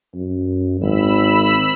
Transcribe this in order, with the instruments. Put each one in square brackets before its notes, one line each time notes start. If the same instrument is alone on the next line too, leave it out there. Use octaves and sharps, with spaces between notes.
[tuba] F#2
[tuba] G#1 [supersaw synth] B5 E6